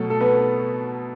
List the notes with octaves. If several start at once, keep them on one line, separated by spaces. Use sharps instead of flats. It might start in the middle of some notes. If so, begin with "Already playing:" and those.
Already playing: B2 F#3 A3 A4
A4
B3 B4